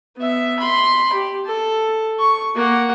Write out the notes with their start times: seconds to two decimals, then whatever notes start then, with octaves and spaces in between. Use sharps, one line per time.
0.17 B3 E5
0.59 B5 C6
1.13 G4
1.46 A4
2.19 C#6
2.55 A#3 F#5